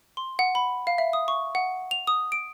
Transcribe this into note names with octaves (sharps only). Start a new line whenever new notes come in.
C6
F#5
B5
F5
E5
D#6
C#6
F#5
F7
D#6
D7